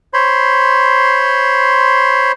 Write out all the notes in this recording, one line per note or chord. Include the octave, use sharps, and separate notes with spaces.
C5 C#5 B5 C6